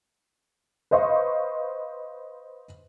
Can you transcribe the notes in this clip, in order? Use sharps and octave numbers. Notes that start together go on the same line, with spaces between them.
B4 C5 D#5 F5 C#6